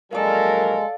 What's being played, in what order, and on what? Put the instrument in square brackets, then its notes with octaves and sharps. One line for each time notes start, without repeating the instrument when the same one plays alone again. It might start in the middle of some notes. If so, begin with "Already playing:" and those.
[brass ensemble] A#1 F#3 A#4 [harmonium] G#3 [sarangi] A4 [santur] D5 F5